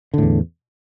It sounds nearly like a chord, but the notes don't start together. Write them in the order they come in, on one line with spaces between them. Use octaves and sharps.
D3 A2 E2